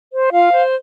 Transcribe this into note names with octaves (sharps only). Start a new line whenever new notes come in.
C5
F4 F5
C5